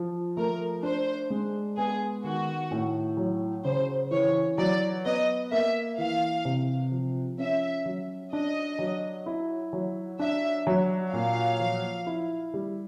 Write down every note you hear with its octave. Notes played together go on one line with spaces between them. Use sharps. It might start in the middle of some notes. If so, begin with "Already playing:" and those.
Already playing: F3
A3 A#4
D4 C5
G#3
B3 G#4
D#3 F#4
A2
F#3
C#3 C5
E3 C#5
F#3 D5
B3 D#5
A#3 E5
E3 F5
C3
F3
C#4 E5
F#3
D4 D#5
F#3
E4
F#3
D4 E5
F#3
A#2 F5
F3
E4
G3